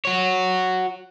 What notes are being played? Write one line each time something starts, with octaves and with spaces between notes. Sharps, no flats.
F#4 C#5